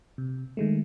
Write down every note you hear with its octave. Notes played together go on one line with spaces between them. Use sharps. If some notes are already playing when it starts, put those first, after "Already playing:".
C3
D#3 G#3 A3